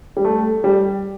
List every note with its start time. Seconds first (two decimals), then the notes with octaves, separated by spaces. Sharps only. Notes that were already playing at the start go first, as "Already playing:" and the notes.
0.17 G3
0.25 A3
0.64 G3